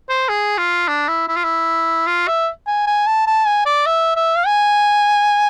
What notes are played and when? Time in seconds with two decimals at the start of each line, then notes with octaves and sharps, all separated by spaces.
0.10 C5
0.29 G#4
0.58 F4
0.88 D4
1.09 E4
1.28 E4
1.37 F4
1.44 E4
2.08 F4
2.28 E5
2.67 G#5
2.87 G#5
3.07 A5
3.27 A5
3.47 G#5
3.66 D5
3.86 E5
4.17 E5
4.37 F5
4.47 G#5